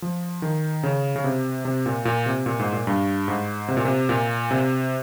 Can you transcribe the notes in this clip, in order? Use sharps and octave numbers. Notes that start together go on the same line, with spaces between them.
F3
D#3
C#3
C#3
C3
C3
A#2
A#2
C3
A#2
G#2
A#2
G2
G#2
C3
A#2
C3
A#2
C3